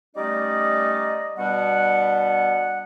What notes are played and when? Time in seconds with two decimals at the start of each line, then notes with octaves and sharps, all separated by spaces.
0.16 G3 A3 C#4 D#4 D5 D#5
1.37 B2 G3 B3 D4 F#5